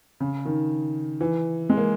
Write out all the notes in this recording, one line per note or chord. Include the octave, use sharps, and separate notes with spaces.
C#3
D#3
E3
G#3
A#3